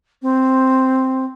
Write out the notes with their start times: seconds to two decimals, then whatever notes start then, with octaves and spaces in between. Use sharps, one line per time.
0.22 C4